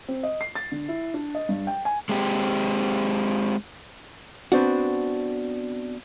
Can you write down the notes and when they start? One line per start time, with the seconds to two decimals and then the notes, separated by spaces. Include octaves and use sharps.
0.08 C4
0.23 D#5
0.41 C7
0.55 A6
0.72 D3
0.88 E4
1.14 D4
1.35 D#5
1.49 G2
1.67 G5
1.85 G#5
2.09 G#3 C4 G4
4.52 B3 C4 D4 F#4